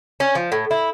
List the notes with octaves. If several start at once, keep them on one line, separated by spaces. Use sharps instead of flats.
C#4
F3
A2
E4